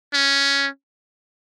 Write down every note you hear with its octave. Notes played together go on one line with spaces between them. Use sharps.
C#4